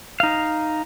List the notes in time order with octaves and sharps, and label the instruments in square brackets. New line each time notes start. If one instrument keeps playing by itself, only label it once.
[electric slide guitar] D#4 F5